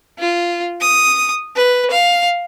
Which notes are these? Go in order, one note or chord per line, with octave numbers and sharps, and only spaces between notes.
F4
D#6
B4
F5